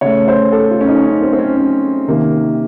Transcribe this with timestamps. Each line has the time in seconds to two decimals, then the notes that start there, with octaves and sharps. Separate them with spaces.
0.01 C#3 A3 C#5
0.28 C5
0.52 A4
0.71 F4
0.81 C#4
0.87 D#4
1.05 C#4
1.22 C4
1.33 C4
1.39 C#4
1.57 C#4
2.08 C3 D#3 A#3